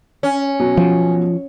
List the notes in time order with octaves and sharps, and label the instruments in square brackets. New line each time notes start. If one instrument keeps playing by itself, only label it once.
[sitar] C#4
[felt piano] B2 F#3
[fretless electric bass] F3